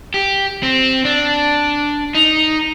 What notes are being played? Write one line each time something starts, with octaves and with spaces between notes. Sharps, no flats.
G4
C4
D4
D#4